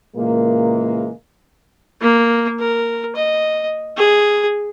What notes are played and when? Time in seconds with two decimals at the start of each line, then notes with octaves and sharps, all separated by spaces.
0.17 A#2 C#3 E3 G#3 A#3
2.02 A#3
2.60 A#4
3.16 D#5
3.98 G#4